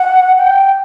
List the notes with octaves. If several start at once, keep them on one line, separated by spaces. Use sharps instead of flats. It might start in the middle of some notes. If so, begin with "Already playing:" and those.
Already playing: F#5
G5